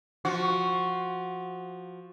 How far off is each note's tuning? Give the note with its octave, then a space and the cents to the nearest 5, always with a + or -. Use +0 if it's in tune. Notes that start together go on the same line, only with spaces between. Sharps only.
F3 +5 F#4 +0